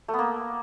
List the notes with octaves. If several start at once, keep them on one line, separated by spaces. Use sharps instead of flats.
A3
B3
A#3